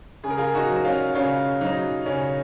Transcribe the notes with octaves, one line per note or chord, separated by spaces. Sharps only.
C#3 G#4
A#4
F4 G#4
D#4 F#4
F#3
C#4 F4
C#3 C#4 F4
F#3 D#4
C#3 C#4